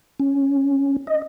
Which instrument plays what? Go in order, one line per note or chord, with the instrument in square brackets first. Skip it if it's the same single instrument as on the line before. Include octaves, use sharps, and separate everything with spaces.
[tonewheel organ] C#4
D#5